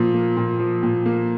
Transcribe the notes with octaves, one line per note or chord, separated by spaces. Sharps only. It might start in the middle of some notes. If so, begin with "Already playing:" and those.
Already playing: A#2 F3
A#3
A#2
F3
A#2
A#3